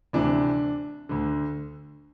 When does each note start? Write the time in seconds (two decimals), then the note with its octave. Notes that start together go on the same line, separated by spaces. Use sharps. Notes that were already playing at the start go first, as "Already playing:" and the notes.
0.13 D2 C3 E3 D4
1.09 D2 D3